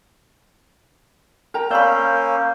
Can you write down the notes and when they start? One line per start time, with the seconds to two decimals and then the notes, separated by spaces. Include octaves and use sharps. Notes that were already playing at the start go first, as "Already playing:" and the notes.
1.54 A#4 G5 A#5
1.71 A#3 C#4 D5 F5 B5 E6 G6